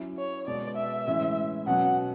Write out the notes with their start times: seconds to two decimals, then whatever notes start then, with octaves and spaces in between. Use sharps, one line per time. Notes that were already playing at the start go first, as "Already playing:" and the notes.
Already playing: F#3 C#4 E4
0.18 C#5
0.47 B2 G#3 B3 D5
0.77 E5
1.07 A2 E3 G#3 C#4 E4
1.67 B2 F#3 C#4 F#5